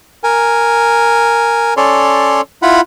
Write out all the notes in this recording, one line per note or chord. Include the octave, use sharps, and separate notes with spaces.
A#4 G#5
C#4 A4 C#5 D5 C6
E4 F4 F#5 B5